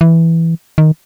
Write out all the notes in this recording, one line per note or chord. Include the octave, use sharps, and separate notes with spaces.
E3
D#3